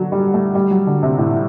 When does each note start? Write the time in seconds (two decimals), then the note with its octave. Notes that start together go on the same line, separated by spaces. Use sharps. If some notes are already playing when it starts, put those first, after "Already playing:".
Already playing: D3 F#3
0.12 G3
0.34 A3
0.55 G3
0.71 F#3
0.87 D3
1.03 C3
1.18 A2